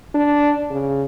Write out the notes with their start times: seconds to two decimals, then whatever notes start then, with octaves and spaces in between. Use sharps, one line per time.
0.15 D4
0.70 C#3